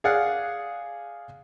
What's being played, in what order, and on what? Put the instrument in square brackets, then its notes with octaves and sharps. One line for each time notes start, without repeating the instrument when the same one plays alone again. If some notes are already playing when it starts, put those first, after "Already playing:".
[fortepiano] G#4 D5 F5 F#5